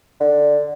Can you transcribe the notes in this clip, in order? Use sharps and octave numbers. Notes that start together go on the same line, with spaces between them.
D3